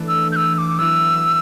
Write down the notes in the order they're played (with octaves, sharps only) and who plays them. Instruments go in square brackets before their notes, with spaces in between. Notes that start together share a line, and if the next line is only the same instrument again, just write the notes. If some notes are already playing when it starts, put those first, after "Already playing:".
Already playing: [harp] E3 A3 D4
[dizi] E6
G6
E6
E6
D6
[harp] F#3 B3 E4 [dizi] E6